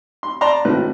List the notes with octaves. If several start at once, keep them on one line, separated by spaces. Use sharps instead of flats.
C6
D5 A5 A#5 C6
G#1 A2 C3 A3 B4 F#6